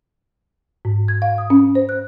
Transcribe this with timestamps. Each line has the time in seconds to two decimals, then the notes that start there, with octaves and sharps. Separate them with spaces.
0.85 G#2
1.08 G#6
1.22 F5
1.38 D#6
1.50 C#4
1.75 C5
1.89 F#6